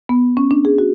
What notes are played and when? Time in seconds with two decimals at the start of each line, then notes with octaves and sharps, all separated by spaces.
0.09 B3
0.37 C#4
0.51 D4
0.65 G#4
0.78 F#4